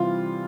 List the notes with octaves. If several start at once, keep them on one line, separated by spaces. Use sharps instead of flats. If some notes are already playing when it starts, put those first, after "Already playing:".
Already playing: C3 E3 G3 F4